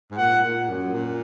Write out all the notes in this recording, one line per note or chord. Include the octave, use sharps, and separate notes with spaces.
G#2
A#2 F#5
A#2
F#2
A#2